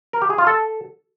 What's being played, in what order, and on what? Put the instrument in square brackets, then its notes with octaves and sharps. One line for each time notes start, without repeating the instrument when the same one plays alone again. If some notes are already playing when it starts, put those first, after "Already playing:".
[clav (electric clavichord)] A#4
G4
G#4
F4
A4